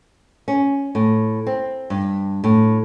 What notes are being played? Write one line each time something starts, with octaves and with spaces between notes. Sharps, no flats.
C#4
A2
C4
G2
A2